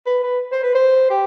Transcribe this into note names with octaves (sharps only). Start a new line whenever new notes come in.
B4
B4
C5
B4
C5
G4